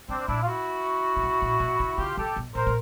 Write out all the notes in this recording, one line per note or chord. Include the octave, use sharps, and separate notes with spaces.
C3 C4 D4
A#2 D4 E4
F4
E4 F#4
C3
B2
A#2
B2
C3
C#3 F4 G4
C3 G4 A4
B2
A#2 A#4 C5
A#2